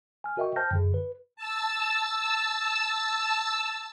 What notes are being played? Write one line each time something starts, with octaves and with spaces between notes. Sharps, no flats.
G#5 F6
F#4 A#4 D#5 E5 G5 C#6
C5 G5 A5 F6 G6 A#6
F#2 D3 G#4
B4
A5 E6